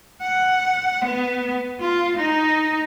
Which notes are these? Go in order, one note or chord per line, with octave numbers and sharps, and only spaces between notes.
F#5
B3
F4
D#4